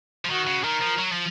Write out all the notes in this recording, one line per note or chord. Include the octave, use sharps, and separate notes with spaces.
F3
D#3 F#4
C#3
D#3 A#4
F3
F#3
F3